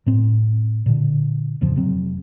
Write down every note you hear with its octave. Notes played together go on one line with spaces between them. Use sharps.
A2 C4
A#2 D3
D1 F2 C#3 F3
F1 C3 F#3 C4